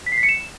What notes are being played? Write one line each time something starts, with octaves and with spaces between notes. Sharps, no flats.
B6
C7
B6
C#7
E7